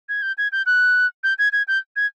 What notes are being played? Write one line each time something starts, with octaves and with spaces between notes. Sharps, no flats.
G#6
G6
G#6
G6
F#6
G6
G#6
G#6
G6
G#6